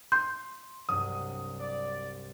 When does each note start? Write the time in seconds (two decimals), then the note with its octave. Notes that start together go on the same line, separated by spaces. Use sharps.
0.12 C6 G6
0.89 C2 G2 F#3 D#6
1.60 D5